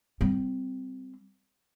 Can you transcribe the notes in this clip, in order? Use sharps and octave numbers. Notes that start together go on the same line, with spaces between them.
G3 C4